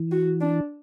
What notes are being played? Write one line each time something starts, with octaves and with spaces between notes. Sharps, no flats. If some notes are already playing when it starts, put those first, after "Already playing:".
Already playing: E3
F#4
D4